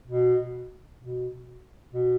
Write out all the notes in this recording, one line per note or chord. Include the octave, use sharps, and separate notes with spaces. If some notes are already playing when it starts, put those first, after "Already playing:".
B2
B2
B2